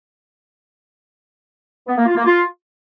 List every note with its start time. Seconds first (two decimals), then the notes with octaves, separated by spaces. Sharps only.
1.87 B3
1.97 A#3
2.06 F4
2.16 A#3
2.25 F4